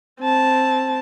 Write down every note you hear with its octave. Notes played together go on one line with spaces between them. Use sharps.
C4 A5